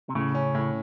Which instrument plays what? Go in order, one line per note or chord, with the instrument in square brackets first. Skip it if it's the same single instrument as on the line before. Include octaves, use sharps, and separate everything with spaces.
[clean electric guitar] C3
[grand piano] A2 [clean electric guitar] C#3
[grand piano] C#4
A2